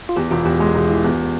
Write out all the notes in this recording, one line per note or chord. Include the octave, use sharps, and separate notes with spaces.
F4
E2 G4
E1 F4
E2 G4
G#3
E1
E3
E2